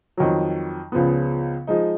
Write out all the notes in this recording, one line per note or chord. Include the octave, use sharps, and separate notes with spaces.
F2 D#3 F#3
C#2 C#3 F3 B3
F3 G#3 D#4